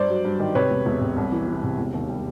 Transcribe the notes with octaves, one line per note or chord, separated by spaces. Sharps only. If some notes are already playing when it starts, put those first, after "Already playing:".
Already playing: G2 C5 D5
F#3
G2
D#3
C3 B4 C#5
E1
E1
C3
C2
E3
E3
C3
E1
D#2
G3